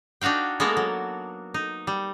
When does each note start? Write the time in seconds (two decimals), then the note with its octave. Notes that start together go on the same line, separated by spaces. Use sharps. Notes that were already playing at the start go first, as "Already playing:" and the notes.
0.21 D4 D#4 F#4 F5 G5
0.60 G#3 A#3 B3 F#4 A4 A#4
0.77 F#3
1.54 D#4
1.87 G3